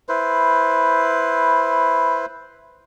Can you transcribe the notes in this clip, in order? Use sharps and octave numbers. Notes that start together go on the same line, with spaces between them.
E4 B4 C5